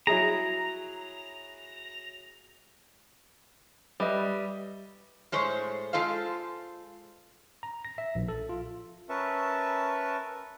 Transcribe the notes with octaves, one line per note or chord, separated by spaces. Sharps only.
F#3 E4 G#4 A#5
G3 B4 D#5 E5
A2 G#3 C5 C#5
G#3 F4 A4 C5 F5
A#5
A#6
E5
A#1
A4
F4
C#4 A#4 B4 E5 A5 C#6